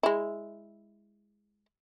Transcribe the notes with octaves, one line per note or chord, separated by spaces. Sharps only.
G#3 E4